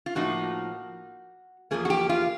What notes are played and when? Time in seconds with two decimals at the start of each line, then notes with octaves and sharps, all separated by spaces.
0.06 F4
0.15 A2 F3 A#3 D#4 F#4
1.71 E2 C#3 F3 A#3 G#4
1.85 F#4
1.90 G4
2.09 F4